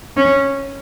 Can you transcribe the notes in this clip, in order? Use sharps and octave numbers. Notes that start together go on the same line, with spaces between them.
C#4